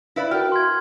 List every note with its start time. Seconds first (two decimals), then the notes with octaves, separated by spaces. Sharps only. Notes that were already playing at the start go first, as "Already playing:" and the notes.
0.16 E4 B4 D5 F5
0.31 F#4 A#4 G5 F6
0.52 C6 G#6